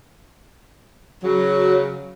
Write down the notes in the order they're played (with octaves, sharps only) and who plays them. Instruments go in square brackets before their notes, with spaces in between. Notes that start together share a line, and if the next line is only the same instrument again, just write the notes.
[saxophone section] C#3 F#3